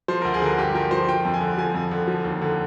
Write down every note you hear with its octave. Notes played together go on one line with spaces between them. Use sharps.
F3 C5
D2 A#4
G#4
D3 A#4
G2 G4
F3 A#4
F3 C5
F3 G5
F2
G#5
D3
F3 G#5
F2
D3
F3
D#2
D3